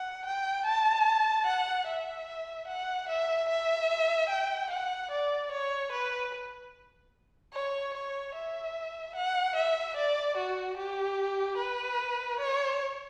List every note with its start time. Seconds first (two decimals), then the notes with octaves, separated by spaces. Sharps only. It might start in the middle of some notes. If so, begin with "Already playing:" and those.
Already playing: F#5
0.25 G5
0.66 A5
1.47 F#5
1.87 E5
2.68 F#5
3.09 E5
3.49 E5
4.30 G5
4.70 F#5
5.11 D5
5.52 C#5
5.92 B4
7.53 C#5
7.94 C#5
8.35 E5
9.15 F#5
9.56 E5
9.96 D5
10.37 F#4
10.77 G4
11.58 B4
12.39 C#5